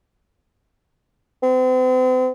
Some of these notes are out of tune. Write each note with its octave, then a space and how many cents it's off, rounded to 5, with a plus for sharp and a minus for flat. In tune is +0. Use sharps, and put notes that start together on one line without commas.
C4 -40